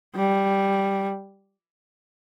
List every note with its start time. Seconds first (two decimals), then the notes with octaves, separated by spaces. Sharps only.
0.16 G3